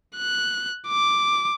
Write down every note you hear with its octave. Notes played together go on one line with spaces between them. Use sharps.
F#6
D6